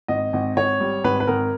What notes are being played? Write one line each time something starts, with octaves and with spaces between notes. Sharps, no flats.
G#1 D#5
G#1
G#1 C#5
G3
G#1 B4
B4
G#1 A#4